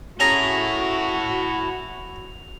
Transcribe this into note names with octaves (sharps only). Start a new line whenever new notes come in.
C#4 E4 F#4 G#4 A4 A#5 F7